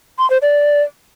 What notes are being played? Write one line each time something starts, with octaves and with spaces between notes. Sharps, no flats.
C6
C5
D5